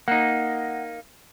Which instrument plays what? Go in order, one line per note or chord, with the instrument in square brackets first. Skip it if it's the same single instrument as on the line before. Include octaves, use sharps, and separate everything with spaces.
[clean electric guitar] A#3 D#4 [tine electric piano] F#5